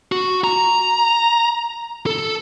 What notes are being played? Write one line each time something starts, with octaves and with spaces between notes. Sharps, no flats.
F#4
A#5
A4